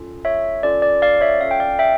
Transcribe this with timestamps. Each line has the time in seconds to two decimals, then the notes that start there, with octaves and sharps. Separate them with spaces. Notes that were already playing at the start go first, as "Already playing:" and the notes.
Already playing: C#4 F4 A4
0.25 C#5 E5
0.63 C#4 F4 A4 D5
0.82 D5
1.02 D5 F5
1.21 C#5 E5
1.41 C#4 F4 A4 F5
1.51 G5
1.60 D5 F5
1.79 E5 G5